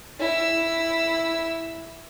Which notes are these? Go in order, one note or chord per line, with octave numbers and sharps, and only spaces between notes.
E4 E6